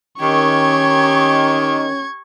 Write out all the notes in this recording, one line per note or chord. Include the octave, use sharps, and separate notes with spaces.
D#3 C#4 G4 C#6 G#6